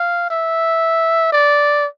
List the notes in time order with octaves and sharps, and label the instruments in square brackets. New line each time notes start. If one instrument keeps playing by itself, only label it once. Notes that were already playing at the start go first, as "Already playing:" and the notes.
Already playing: [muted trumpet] F5
E5
D5